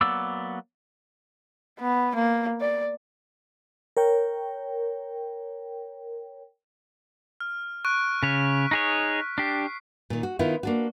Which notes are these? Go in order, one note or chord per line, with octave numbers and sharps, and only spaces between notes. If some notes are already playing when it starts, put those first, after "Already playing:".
F#3 A#3 B3 D5 E6
B3
A#3
D5
A#4 C#5 G5
F6
C#6 F#6 D7
C#3 C#5 B6
D#4 G#4 C#5
D4 G4 C7
A#2 D#3
F#4
D#3 B3 E4 F4
A#3 D4 F#4